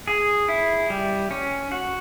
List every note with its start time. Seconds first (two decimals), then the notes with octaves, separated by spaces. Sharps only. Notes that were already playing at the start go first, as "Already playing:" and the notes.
0.08 G#4
0.48 E4
0.90 G3
1.31 C#4
1.72 F#4